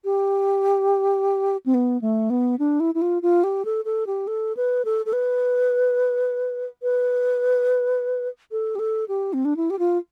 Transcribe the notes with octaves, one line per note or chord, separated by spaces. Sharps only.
G4
C4
B3
A3
B3
D4
E4
E4
F4
F4
G4
A4
A4
G4
A4
B4
A4
A4
B4
B4
A4
G4
A4
G4
C4
D4
E4
G4
F4